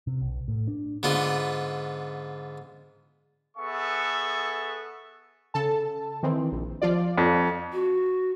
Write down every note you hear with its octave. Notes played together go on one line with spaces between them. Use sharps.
C3
B1
A2
D4
G#2 D3 B3 F4
B3 G#4 A4 E5 C#6
C#3 A4 A5
D#3 E3 C4
A#1
F3 F4 D5
F2
F#4